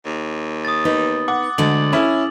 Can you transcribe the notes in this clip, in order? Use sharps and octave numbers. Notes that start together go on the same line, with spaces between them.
D#2
D#6 A6
B3 D#4 B4
F#5 D6
D2 D3 G#3 D4 A6 F#7
C#4 E4 G#4